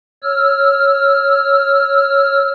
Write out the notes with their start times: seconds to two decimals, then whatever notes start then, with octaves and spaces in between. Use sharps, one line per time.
0.23 C#5 E6 F6